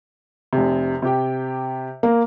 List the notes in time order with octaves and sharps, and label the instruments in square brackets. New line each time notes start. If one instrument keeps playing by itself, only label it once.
[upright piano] F1 C3
C3 G4 G5
[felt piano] A#3